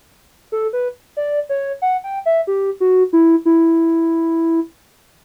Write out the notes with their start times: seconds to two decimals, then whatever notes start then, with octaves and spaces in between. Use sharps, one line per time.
0.52 A4
0.73 B4
1.17 D5
1.49 C#5
1.82 F#5
2.04 G5
2.26 E5
2.47 G4
2.80 F#4
3.13 E4
3.45 E4